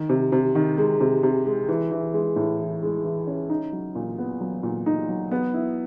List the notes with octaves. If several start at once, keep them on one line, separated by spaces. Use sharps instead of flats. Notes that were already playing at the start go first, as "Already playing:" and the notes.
Already playing: D#3
C3
C3
D#3
G#3
C3
C3
G#3
E3
E3
G#3
A2
E3
G#3
E3
C#4
D#4
F#3
A#2
B3
F#3
A#2
D#4
F#3
B3
E4